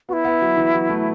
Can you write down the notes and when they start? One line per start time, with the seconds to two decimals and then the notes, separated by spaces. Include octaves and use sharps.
0.09 B3 E4 F#4
0.25 B3
0.42 F#3
0.57 E3
0.74 F#3
0.89 A3